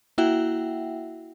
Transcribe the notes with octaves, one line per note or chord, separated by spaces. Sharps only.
A#3 E4 F#4 E5 F#5 G5